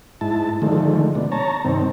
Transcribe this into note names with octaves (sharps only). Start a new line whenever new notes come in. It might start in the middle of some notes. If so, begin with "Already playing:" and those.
G#2 E4 A5
D3 D#3 F3 G#3 A3
B2 D4
C#5 A5 A#5
G2 C3 D#3 C4